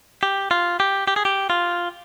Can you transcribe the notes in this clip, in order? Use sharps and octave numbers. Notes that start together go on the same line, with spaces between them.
G4
F4
G4
G4
G#4
G4
F4